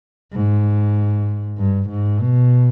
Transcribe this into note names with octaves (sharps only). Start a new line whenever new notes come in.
G#2
G2
G#2
B2